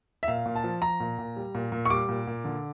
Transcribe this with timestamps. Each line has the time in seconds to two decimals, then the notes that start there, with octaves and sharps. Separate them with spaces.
0.23 E5
0.28 A#2 F5
0.46 A#2
0.56 A5
0.64 F3
0.82 F3 A#5
1.00 A#2
1.19 A#2
1.36 G3
1.55 A#2
1.72 A#2
1.85 C#6
1.90 G3 D6
2.09 A#2
2.27 A#2
2.45 D3